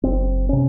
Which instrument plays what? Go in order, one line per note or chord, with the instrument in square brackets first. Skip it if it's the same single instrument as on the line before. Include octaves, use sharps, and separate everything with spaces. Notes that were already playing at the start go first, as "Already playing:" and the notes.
[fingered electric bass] F#1 C4
C3 C#4